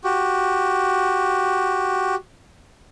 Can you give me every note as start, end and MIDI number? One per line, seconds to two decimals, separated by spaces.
0.04 2.15 66
0.04 2.15 67